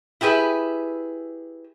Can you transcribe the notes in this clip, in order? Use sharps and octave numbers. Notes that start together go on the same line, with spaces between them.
E4 G4 G#4 B4 E5